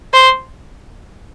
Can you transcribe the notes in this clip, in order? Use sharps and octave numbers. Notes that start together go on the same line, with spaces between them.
C5